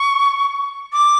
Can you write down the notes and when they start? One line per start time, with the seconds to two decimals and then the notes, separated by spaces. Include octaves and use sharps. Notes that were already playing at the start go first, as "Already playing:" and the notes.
Already playing: C#6
0.93 D6